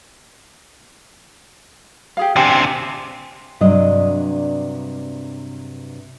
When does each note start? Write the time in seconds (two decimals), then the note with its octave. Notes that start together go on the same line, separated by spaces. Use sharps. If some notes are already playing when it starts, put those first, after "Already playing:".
2.17 G4 G#4 F5
2.36 D3 C4 G4 G#5
3.61 G2 C3 F#3 D4 D#5